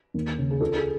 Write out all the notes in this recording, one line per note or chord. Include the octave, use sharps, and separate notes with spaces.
D#2
C#3
G#4
C#2 A4
G#4